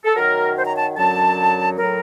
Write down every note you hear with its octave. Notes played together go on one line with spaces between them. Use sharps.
A4
F#2 D#3 F#3 A#4
C5
A#5
A5
F#2 D3 F#3 A5
A2 F#3 A#4